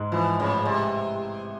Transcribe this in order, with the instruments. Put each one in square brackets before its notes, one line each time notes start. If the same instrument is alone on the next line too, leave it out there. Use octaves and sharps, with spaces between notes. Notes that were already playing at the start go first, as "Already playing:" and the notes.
Already playing: [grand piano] G#2 G#3
[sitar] E3 [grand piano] F3
[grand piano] A1 [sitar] C#3
[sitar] C3 [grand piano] G#3